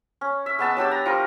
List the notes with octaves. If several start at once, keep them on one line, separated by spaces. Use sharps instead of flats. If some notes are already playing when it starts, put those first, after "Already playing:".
C#4
E5
G#3 B3 A5 E6
F#3 D4 G4 E6
A#5
F3 G3 A#4